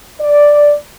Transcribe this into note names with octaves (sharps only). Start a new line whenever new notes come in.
D5